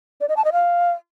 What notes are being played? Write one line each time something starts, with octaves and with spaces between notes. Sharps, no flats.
D5
D#5
A5
D#5
F5